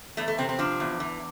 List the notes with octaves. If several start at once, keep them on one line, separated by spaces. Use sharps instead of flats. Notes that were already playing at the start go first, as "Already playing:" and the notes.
E2 A3
A3
C3 C4
C4
F3 D4
E2
E3